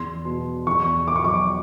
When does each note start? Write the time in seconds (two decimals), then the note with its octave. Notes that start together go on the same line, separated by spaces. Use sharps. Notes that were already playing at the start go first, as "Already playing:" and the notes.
Already playing: E2 C6
0.25 B2
0.67 E2 C#6
1.07 B2 D6
1.16 C#6
1.24 D6